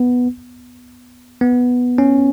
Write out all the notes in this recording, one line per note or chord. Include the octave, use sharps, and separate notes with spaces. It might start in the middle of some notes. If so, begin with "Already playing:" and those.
Already playing: B3
B3
C#4